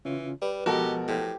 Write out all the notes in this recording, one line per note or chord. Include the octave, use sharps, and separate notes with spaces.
C#3 E3 C#4 F4
G3 B4
B2 F3 G#3 F#4 G4 A4 A#4
A2 G4 C5